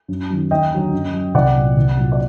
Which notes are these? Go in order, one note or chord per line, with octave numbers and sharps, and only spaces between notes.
F#2
D#3 F#3
D#2 D#5 G5
D3 F#3
F#2
F#3
C2 D5 F#5
A#2 F#3
C2
A#2 F#3
D5